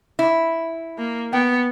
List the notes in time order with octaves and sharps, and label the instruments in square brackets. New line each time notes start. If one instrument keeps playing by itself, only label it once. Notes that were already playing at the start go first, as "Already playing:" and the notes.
[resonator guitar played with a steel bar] E4
[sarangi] A#3
[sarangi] B3 [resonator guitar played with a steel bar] G5